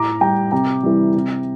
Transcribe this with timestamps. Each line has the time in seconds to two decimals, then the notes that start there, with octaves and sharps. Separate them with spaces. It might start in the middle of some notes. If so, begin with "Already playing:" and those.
Already playing: A2 A#5 D6
0.21 G3 G5 A#5
0.52 C3 G5 A#5
0.83 E3 G3
1.14 C3